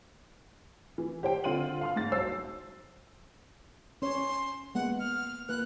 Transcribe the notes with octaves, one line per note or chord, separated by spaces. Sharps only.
E3
G4 C5 G5
D3 C4 F4 C6 D#7 F#7
F5 C6 F6
G#2 A6
B1 C5 E6 C7
C#4 C#5 C6
G#3 A#3 B3 F#5
F6
A#3 B4 F#6